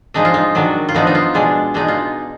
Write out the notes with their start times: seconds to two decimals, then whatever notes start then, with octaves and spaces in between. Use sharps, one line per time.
0.14 F3 G#3 D4 D#4
0.25 F4
0.34 D#4
0.55 D#3 F#3 D4
0.89 F4
0.95 F3 B3 D4 D#4
1.07 D#4
1.15 F4
1.34 B2 G#3 D4
1.74 B2 G#3 D4 D#4
1.88 F4